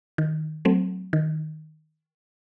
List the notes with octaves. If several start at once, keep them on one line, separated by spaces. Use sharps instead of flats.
D#3
F#3 A3 C4
D#3